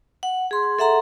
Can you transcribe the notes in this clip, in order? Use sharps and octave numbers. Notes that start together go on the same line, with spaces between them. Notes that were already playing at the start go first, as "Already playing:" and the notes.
F#5
G#4 C6
A4 E5 F#5 A#5 C6